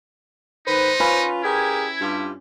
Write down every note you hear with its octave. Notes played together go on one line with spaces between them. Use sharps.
D#3 D#4 B4 C5
C#4 F4 B4
E4 G4 G#4 A#4 G#6
G2 F4 G4